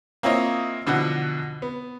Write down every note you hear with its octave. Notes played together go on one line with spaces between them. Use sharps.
A#3 C4 E4 F4 C#5 D#5
B2 D3 E3 F3 F#5
B3